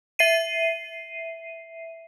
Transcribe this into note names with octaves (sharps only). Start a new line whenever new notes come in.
E5 C7 D#7